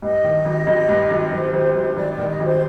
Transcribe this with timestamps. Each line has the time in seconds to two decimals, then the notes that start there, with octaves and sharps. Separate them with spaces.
0.02 G2 D#5
0.24 D#3
0.45 G#1
0.67 G#1
0.89 G2
1.11 G#1
1.32 G#1 C5
1.53 G#1 C5
1.75 G#1 C5
1.96 G#1 D5
2.12 D5
2.18 D#3
2.28 D#5
2.40 G#1 C5